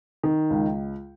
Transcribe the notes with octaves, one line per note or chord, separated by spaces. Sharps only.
D#3
C#2